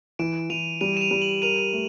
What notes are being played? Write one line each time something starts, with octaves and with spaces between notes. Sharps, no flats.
E3 D7 E7
E3 D#7 F7
G3 D#7 F7
E7
D#7 F7
G3
E7 F#7
A#4 D#7 F7
A3